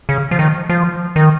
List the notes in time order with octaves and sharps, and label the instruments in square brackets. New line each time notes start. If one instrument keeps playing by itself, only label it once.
[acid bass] C#3
F3
D#3
F3
D#3